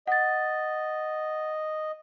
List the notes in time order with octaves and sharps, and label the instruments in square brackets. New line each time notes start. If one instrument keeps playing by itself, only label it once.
[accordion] D#5 [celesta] F#5 A6